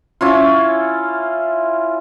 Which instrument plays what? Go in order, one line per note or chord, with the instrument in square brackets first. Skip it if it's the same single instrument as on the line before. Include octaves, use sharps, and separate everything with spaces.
[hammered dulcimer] C#4 E4 F4